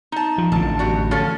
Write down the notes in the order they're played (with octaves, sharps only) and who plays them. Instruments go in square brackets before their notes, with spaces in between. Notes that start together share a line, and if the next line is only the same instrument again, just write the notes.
[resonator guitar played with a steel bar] D#4 A5
[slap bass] F3
[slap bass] A1 D3 [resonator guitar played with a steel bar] A5
[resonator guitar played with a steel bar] G3 F#4
F3 C#4 A4